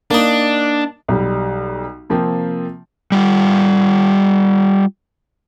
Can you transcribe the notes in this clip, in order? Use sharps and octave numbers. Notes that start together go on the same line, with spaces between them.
A#3 D4 D#4
B1 G3
C3 F3 A#3 C4
G3 F4